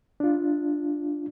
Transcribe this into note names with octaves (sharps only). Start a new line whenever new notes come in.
D4 F4